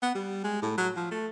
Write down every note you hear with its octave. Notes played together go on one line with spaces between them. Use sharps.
B3
G3
G#3
A2
F#3
F3
A3